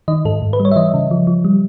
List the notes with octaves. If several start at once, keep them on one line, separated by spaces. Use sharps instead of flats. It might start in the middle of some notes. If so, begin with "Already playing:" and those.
D#3 D#5
G#2 A4
G#2
B4
G3
C#5
E5
E3 D#5
C#3
F3
F3
G3